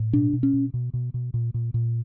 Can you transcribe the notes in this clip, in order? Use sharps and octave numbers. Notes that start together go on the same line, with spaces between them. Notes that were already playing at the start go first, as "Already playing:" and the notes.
Already playing: A2
B2 D4
B2
C#4
B2
B2
B2
B2
A#2
A#2
A#2